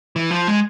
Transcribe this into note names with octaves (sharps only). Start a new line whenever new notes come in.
E3
F3
G#3